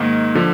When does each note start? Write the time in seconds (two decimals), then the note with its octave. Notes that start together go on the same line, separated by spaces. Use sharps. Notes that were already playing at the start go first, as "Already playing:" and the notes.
Already playing: G#2 D#3 A#3 D#4
0.35 D3 F3